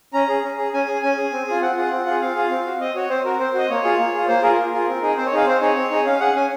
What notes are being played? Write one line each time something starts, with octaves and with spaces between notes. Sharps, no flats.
C#4 A#5
G#4
C#4
G#4
C#4 G#5
G#4
C#4 G#5
G#4
C4
F4 G#4
C4 F#5
F4 G#4
C4
F4 G#4
C4 F5
F4 G#4
C4
F#4
C4 D#5
F#4 C#5
C4 C5
F#4 A#4
C4 C5
F#4 D#5
A#3 C#5
F4 G#4
A#3
F4 G#4
A#3 C5
F4 G#4 A#4
A#3
F4 G#4
C4
D#4 G#4
C4 C5
C#5
D#4 G#4 F5
C4 C5
D#4 G#4 C#5
C4
D#4 G#4
C#4 F5
G#4 F#5
C#4 G#5